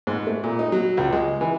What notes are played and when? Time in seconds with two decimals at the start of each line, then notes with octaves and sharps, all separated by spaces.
0.07 G#2
0.27 A3
0.44 A#2
0.59 D#4
0.72 F#3
0.97 C#2
1.13 G#3
1.41 E3